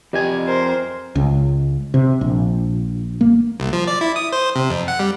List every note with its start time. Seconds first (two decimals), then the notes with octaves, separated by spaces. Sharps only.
0.13 F2 G4 D5 D#5 G#5
0.47 A#4 C5
1.15 C#2
1.94 C3
2.21 A#1
3.21 A#3
3.60 C2
3.73 F3
3.88 D5
4.01 E4
4.16 D#6
4.33 C5
4.56 C3
4.70 F2
4.88 F#5
4.99 G3